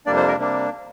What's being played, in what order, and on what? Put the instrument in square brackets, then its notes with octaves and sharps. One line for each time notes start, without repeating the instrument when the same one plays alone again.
[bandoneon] F2 C3 G3 A#3 D4 D5
C5
A#4
C3 G3 A#3 D4